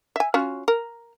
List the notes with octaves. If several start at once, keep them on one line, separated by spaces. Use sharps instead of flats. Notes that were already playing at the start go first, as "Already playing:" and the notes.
E5 G#5
C#4 F4 F#4
A#4